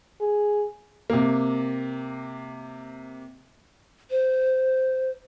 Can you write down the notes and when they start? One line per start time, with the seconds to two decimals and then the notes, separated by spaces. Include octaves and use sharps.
0.21 G#4
1.10 C3 A#3
4.11 C5